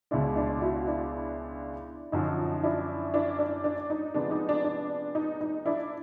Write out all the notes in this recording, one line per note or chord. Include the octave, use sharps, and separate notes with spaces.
C#2 B2 G#3 D4 E4
D4 E4
E4 F#4
D4 E4
F#2 D3 F3 D#4 F4
D4 E4
D4 E4
D4
D4
D#4
C3 F3 G#3 B3 D4
D#4
D4
D4
D#4
D#4
D4 E4